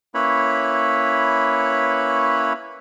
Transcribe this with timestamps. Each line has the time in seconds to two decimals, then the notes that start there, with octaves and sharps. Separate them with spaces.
0.15 A#3 C#4 E4 B4 C#5 B5